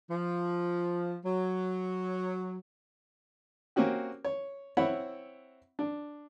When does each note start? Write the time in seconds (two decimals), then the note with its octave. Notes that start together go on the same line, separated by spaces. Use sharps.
0.11 F3
1.25 F#3
3.76 A#3 C4 C#4 F#4 G4
4.24 C#5
4.77 C4 E4 C#5 F#5 B5
5.79 D4